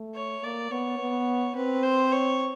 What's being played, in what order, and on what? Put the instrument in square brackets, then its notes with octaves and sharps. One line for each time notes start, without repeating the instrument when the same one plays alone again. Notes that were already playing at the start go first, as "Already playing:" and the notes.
Already playing: [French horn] A3
[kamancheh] C#5
[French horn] A#3 [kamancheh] D5
[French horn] B3 [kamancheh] C#5
[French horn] B3
[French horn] C4 [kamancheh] B4
[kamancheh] C5
C#5